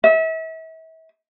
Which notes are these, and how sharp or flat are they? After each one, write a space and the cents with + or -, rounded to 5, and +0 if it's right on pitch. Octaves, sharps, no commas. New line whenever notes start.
E5 -35